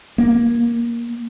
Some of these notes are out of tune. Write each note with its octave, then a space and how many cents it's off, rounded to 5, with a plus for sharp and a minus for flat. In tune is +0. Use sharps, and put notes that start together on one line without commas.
A#3 +15